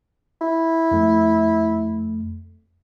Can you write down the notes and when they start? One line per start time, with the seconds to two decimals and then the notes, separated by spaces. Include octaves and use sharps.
0.41 E4
0.91 F2 A3